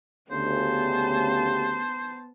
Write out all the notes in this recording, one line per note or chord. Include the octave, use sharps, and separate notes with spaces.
D2 C#3 B3 G4 C5 A5